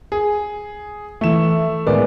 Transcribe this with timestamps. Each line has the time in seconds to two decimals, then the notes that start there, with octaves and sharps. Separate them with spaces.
0.12 G#4
1.21 E3 A3 E5 E7
1.87 A2 D#3 G#3 B3 A#4 D5